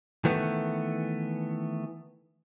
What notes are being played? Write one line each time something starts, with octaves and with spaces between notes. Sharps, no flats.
D#3 E3 A3 B3